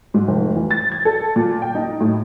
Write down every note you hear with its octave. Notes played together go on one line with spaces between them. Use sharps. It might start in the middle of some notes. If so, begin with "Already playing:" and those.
G#2
F1
E3
A6
G#6
A4
A#2
G5
D#4
A2